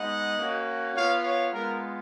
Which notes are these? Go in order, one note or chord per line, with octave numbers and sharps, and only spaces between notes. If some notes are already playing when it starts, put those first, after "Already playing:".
Already playing: G#3 B3 D#4 D#5 F#5
A#3 C#4 F#4
B3 F4 C#5 F5
C#5 F5
G#3 B3 F4 A#4